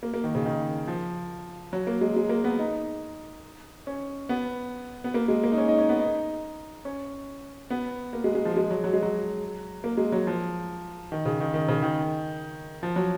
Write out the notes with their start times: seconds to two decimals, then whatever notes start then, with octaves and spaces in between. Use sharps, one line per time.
0.03 A#3
0.14 A#3
0.24 D#3
0.35 C#3
0.45 D#3
0.88 F3
1.73 F#3
1.87 A#3
2.01 G#3
2.16 G#3
2.29 A#3
2.44 B3
2.59 D#4
3.87 C#4
4.29 B3
5.04 B3
5.14 A#3
5.28 G#3
5.43 A#3
5.52 D#4
5.58 C#4
5.68 D#4
5.78 C#4
5.89 B3
6.00 D#4
6.85 C#4
7.70 B3
8.13 A#3
8.24 G#3
8.35 G#3
8.45 F3
8.56 G#3
8.71 F#3
8.84 F#3
8.93 G#3
9.03 F#3
9.84 A#3
9.97 G#3
10.12 F#3
10.27 F3
11.12 D#3
11.25 C#3
11.40 D#3
11.54 D#3
11.68 C#3
11.82 D#3
12.83 F3
12.96 F#3